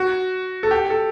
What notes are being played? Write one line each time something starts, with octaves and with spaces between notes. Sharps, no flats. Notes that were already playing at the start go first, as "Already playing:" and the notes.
Already playing: F#4
A4
G4
A4